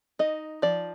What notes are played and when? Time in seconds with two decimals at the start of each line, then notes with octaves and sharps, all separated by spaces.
0.19 D#4 D#5
0.62 F3 D5